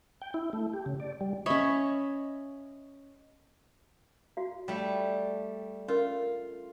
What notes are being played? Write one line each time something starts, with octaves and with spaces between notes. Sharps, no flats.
G5
E4
A3
G4
C#3
D5
G3
C#4 C#5 D#5 E5 B5
F#4 F5
G3 A3
C#4 F4 A#4